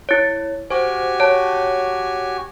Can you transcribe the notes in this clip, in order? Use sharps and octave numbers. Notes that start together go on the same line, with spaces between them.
E4 C#5
F#4 G4 C5 G#5
C#5 A5